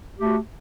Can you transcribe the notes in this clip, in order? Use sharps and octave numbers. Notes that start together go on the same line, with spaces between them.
A3 F#4 G4